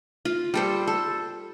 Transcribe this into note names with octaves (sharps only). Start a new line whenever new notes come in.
F4
G3 A4 C5
A4